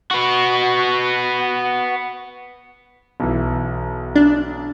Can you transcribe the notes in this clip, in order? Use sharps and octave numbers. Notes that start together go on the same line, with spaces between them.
B3 F#4
B1 E3
D4